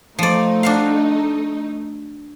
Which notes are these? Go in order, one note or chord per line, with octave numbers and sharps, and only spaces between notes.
F3 A3 D#4 D5
D4 F#4 F5